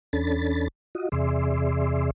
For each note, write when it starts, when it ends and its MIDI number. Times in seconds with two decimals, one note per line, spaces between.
0.13 0.68 40
0.13 0.68 61
0.13 0.68 62
0.13 0.68 69
0.13 0.68 83
0.13 0.68 93
0.95 1.09 65
0.95 1.09 66
0.95 1.09 75
1.12 2.10 40
1.12 2.10 48
1.12 2.10 68
1.12 2.10 74
1.12 2.10 76
1.12 2.10 84